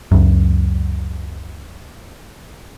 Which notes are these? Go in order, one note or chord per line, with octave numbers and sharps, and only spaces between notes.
C#2 F#2